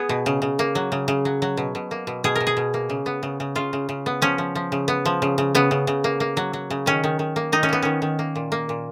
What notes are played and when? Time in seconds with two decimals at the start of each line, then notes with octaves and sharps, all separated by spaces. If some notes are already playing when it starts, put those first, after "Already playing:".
Already playing: B3 G#4
0.09 B2
0.26 C#3
0.42 C#3
0.59 A#3
0.75 F#3
0.92 C#3
1.08 C#3
1.25 F#3
1.42 F#3
1.57 B2
1.75 B2
1.91 A#3
2.07 B2
2.24 B2 G#4
2.36 B2 A#4
2.47 G#4
2.57 B2
2.74 A#3
2.90 C#3
3.06 B3
3.23 C#3
3.40 C#3
3.56 C#3 F4
3.73 C#3
3.89 C#3
4.06 B3
4.22 F3 C#4
4.38 F3
4.55 F3
4.72 C#3
4.88 B3
5.05 F3
5.22 C#3
5.38 C#3
5.55 C#3 B3
5.71 C#3
5.87 C#3
6.04 A#3
6.20 A#3
6.37 F#3
6.53 F#3
6.70 C#3
6.86 D#3 C#4
7.04 D#3
7.19 D#3
7.36 A#3
7.52 D#3 D#4
7.63 C#4
7.69 A#3 B3
7.83 D#3 C#4
8.02 D#3
8.19 A#3
8.36 A#2
8.52 A#3
8.69 A#2